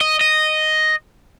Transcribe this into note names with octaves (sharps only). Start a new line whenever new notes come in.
D#5
D#5